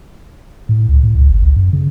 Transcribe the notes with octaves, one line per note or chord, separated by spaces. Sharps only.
A2
C#2
A2
C#2
G1
C#2
F#2
C#3